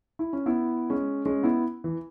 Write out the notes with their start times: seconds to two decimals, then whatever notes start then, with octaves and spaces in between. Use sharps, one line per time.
0.19 E4
0.33 C#4
0.46 B3 E4
0.90 G#3 C#4
1.25 G#3 C#4
1.43 B3 E4
1.84 E3